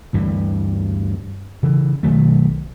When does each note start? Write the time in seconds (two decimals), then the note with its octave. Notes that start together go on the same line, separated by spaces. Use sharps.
0.13 D2 G2 E3
1.63 C#3 E3
2.03 B1 D#3 F#3 A3